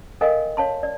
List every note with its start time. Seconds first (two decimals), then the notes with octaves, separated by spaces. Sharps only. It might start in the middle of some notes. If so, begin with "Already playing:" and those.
0.21 A4 A#4 D#5 F5 G5 G#5
0.57 C#5 F5 A5 C6
0.83 D5